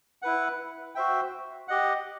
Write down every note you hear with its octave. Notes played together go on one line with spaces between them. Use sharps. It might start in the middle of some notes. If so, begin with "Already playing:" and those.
E4 B4 F#5
F#4 C5 E5 G5
G4 D#5 F#5